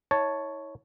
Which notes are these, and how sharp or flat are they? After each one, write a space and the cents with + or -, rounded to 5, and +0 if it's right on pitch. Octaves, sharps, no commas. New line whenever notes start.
E4 -45 C#5 +0 A5 +0